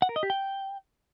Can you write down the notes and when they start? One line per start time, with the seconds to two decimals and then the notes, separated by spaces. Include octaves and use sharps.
0.02 F#5
0.09 A#4
0.16 D#5
0.23 G4
0.30 G5